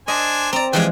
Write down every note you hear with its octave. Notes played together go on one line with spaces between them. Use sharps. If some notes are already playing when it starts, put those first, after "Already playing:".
D4 C5 D#5 G#5
C4 D5 A#5
E3 F3 G#3 G4 G#4 G5